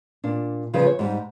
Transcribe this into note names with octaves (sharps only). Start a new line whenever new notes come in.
A#2 D4
C#3 F3 G3 B4 D5
C#5
G#2 G3 D#4 G4